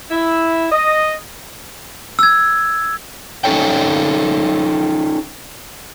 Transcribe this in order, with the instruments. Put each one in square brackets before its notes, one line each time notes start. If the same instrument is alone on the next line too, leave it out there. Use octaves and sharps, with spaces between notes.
[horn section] E4
D#5
[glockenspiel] E6 G#6
[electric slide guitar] C#4 D#4 A4 C#5 G5